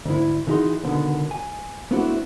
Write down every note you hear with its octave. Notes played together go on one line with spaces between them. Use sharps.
D2 G#2 E4
D3 E3 D#4 F#4 G#4 C6
C#2 B2 D3 D#3 B3
G#5
A3 B3 C4 D4 E4 F#4